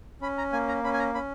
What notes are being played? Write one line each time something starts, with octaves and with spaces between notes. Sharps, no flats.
C#4 B5
A#5
A#3 G#5
A#5
C#4 B5
G#5
A#5
C#4 B5